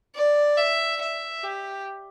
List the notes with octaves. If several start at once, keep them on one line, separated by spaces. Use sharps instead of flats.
D5
E5
E5
G4